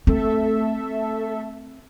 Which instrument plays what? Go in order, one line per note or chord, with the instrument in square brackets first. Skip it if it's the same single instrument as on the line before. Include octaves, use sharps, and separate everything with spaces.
[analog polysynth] A3 A4 E5 [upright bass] C4